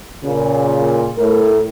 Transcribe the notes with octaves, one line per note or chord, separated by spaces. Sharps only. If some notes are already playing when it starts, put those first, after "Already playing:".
A#2 C#3
A2 A#4